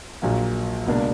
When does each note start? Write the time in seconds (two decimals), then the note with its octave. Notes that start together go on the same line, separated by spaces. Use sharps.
0.22 A#1 A#2 F#3 A#3
0.86 C#2 B2 A#3 D4